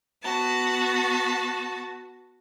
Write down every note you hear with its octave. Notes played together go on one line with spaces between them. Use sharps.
B3 F#4 A5